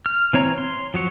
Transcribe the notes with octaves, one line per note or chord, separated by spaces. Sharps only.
F6
E3 C4 C#5 A#5
C6
F3 F#3 C#5